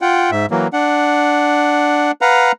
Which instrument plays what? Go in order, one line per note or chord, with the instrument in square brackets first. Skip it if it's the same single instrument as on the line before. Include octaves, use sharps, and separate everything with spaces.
[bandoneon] F4 F#5 G5
G#2 E5
E3 F#3 A#3
D4 F#5
B4 F5 F#5 A#5